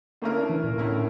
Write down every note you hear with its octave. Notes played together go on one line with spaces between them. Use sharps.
D3 A3 A#3 C#4 E4 A#4
D4
E3
A#2
A2 D3 A3 C#4 E4 A#4